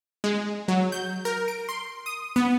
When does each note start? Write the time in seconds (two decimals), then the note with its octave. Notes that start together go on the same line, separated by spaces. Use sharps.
0.24 G#3
0.68 F#3
0.92 G6
1.25 A#4
1.48 D7
1.69 C6
2.06 D#6
2.36 B3